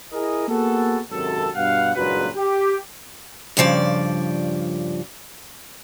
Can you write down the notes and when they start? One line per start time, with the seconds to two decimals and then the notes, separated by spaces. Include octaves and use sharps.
0.12 E4 G#4 A#4 D#5
0.47 A#3 B3 F#4 G#4 A4
1.11 G#1 F#2 C3 D#3 F#3 A4
1.55 G2 B2 F5 F#5
1.95 F#1 G2 A#2 G#3 F#4 B4
2.36 G4
3.57 G2 C#3 F3 D5